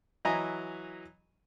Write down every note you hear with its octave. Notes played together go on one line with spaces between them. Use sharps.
E3 F#3 D#5 E5 G#5 A#5